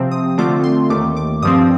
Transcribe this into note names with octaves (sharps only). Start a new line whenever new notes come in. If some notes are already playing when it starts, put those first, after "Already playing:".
Already playing: C3 F3 C4
D#6
D3 A3 C4 F4 D6
C6
D#2 D#3 A3 D6
D6
G2 F3 C4 D#6